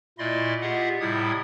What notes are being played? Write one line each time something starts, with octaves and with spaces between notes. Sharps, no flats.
A#2 A3 E4 D5 D#5 C6
F4 G4 G#4 D#5 E5 F#5
A2 C3 G3 E4 D#6 G#6